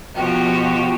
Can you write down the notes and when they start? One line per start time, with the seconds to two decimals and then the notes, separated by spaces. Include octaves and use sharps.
0.16 B2 F3 F#4 G4